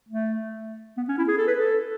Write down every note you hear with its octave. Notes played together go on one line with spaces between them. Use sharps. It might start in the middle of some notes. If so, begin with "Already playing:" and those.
A3
B3
C#4
E4
G#4
A4
B4
A4